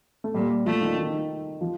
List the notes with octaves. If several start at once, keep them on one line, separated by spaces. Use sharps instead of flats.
A3
A#2 G3
F3 A3
D#3
D#3
F3